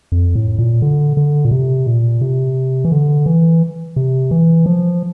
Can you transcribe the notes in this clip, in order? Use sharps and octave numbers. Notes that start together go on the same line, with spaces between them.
F2
A2
A#2
D3
D3
A#2
C3
A#2
C3
E3
D3
E3
C3
E3
F3